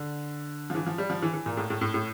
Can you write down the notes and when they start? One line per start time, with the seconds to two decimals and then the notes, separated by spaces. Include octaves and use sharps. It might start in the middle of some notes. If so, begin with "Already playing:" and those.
Already playing: D3
0.70 F3
0.75 E3
0.87 F3
0.98 G3
1.10 F3
1.22 E3
1.34 E3
1.46 A#2
1.57 A2
1.70 A2
1.81 A2
1.94 A2